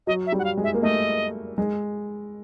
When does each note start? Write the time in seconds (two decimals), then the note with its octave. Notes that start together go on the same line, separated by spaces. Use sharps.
0.07 F#3 D#5
0.27 E5
0.32 G3
0.39 F#5
0.44 F5
0.57 G#3
0.64 E5
0.74 A#3
0.82 A3 D#5
1.58 G#3